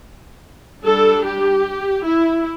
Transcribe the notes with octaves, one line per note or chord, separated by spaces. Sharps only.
G3 D4 A4
G4
E4